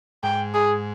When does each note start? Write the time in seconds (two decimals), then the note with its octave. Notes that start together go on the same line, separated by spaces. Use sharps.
0.23 G#2 G5
0.55 G#4